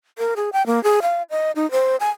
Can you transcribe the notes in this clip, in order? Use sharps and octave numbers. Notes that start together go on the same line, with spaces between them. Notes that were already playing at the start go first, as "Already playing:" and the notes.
A#4
G#4
G5
A#3
G#4
F5
D#5
D#4
C5
G#5